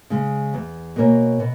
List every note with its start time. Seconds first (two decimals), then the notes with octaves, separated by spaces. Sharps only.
0.10 C#3 G#3
0.54 E2
0.96 B2 A#3 C#4
1.39 B2